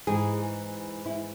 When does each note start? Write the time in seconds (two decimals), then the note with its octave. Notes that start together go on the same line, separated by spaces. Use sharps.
0.07 G#2 E3 G#4
1.06 E4